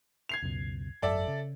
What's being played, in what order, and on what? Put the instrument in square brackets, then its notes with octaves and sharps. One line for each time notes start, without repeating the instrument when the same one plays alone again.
[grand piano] G#6 C7 F7
[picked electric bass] C#2 F#2 B2
[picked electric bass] G#1 F#2 [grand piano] A4 D5 E5
[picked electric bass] C#3